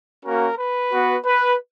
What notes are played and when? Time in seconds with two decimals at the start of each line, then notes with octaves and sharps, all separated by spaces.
0.24 A#3 C#4 F#4 A#4
0.58 B4
0.91 B3 F#4
1.24 B4